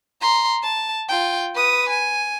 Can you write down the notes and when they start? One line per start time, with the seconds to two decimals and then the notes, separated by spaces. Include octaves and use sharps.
0.21 A#5 C6
0.63 A5
1.09 F4 G5
1.55 B4 D#6
1.90 G#5